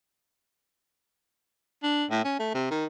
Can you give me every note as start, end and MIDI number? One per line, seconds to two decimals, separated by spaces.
1.83 2.05 62
2.11 2.21 45
2.24 2.39 61
2.39 2.50 57
2.54 2.68 48
2.71 2.85 51